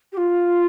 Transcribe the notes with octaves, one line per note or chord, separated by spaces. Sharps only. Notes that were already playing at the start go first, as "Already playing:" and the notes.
G4
F4